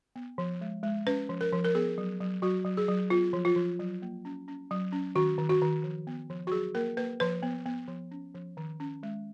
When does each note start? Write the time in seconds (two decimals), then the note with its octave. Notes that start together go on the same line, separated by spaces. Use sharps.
0.16 B3
0.38 F3
0.61 G#3
0.83 G#3
1.07 C#4 B4
1.29 F3
1.41 A#4
1.52 F3
1.65 A#4
1.75 B3 G#4
1.98 F#3
2.21 F#3
2.42 F#3 F#4
2.65 F#3
2.77 G#4
2.88 F#3
3.10 B3 F4
3.33 F3
3.45 F4
3.56 F3
3.79 F#3
4.02 A#3
4.25 C#4
4.48 C#4
4.71 F#3
4.93 C#4
5.15 D#3 F#4
5.38 D#3
5.49 F#4
5.62 D#3
5.84 F3
6.07 B3
6.30 F3
6.47 F#4
6.52 F#3 G#4
6.75 A#3 A#4
6.97 A#3 B4
7.20 F3 B4
7.43 B3
7.66 B3
7.88 F3
8.11 C#4
8.35 F3
8.57 D#3
8.80 C#4
9.03 G#3